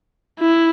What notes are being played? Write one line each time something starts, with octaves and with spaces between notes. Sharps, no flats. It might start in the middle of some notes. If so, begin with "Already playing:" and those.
E4